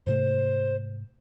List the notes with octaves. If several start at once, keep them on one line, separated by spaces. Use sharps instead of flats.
G#2 C3 A3 C5